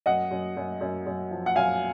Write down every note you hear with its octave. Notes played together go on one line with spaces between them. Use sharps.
F#2 D#5 F#5
F#2
F#2
F#2
F#2
F3
F#5
F#2 F5 G#5